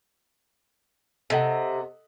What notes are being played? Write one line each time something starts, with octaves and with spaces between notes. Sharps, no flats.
C3 A4 D#5 F#5